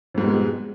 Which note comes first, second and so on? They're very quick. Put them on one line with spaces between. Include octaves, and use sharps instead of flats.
F2 G#2 G3 B2 G#3